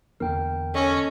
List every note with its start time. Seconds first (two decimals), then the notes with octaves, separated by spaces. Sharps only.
0.20 E2 D3 A#3 A#4 G5
0.74 C#4 A4 D#5 C#6